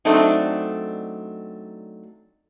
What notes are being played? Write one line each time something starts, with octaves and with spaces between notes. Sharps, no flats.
F#3 A3 C4 D4 D#4